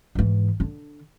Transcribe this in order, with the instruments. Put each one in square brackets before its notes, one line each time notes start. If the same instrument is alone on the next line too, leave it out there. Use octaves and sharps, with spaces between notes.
[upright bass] G#2 E3
D3 D4